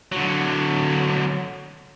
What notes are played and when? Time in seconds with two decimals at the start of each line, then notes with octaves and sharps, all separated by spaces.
0.12 D3 F#3